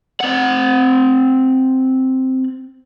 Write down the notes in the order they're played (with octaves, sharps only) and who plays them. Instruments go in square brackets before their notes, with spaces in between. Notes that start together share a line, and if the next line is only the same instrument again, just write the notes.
[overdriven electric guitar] C4 F#5